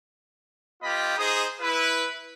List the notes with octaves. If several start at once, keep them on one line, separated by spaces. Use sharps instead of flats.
B3 F4 G4 D#5 B5
D#4 G#4 C5 D#6
E4 B4